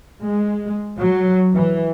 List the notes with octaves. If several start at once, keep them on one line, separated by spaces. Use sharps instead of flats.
G#3
F#3
E3